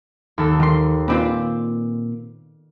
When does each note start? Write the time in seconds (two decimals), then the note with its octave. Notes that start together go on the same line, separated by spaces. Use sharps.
0.38 D#2 A4
0.60 D#3 C6
1.08 A#2 C4 F4 B4 D5